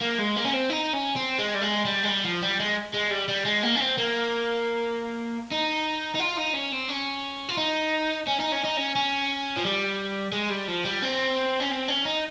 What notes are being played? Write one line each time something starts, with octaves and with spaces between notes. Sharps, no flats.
A#3
G#3
A#3
C#4
C4
D#4
C#4
C4
G#3
G3
G#3
G3
G#3
G3
F3
G3
G#3
G#3
G3
G3
G#3
A#3
C#4
C4
A#3
D#4
D#4
F4
D#4
C#4
C4
C#4
F4
D#4
C#4
D#4
C#4
D#4
C#4
C#4
F3
G3
G#3
G3
F3
G3
C4
C#4
C4
C#4
D#4